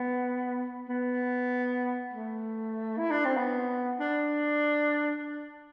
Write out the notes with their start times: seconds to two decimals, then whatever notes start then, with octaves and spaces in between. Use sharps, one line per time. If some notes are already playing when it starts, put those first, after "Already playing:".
Already playing: B3
0.89 B3
2.13 A3
2.98 E4
3.11 D4
3.25 C4
3.37 B3
4.00 D4